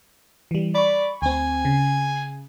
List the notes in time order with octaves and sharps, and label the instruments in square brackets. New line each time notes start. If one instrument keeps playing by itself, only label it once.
[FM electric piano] E3 G3
[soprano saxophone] D5 [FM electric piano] B5 C#6
[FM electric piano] D2 C4 [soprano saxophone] G#5
[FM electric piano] C#3